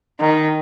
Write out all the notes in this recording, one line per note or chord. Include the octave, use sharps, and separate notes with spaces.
D#3